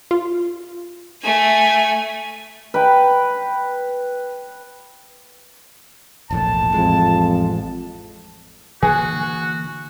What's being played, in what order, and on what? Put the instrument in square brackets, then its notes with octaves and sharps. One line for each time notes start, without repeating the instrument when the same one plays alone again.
[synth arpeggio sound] F4
[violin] A3 G#5
[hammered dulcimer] B4 G5
[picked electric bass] E1 A#1 A2 [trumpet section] A5
[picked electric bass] A1 G#3 [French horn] F2
[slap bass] D3 E3 A#3 [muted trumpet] F#4 [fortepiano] G#4